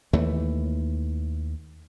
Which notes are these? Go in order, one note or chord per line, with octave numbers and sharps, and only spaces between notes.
D#2 E3 A3